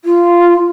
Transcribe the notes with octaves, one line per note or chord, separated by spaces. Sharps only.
F4